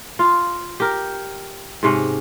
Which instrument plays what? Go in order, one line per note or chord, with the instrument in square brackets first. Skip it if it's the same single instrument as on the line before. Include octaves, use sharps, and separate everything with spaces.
[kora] F4
G4 A#4
G#2 C3 C#4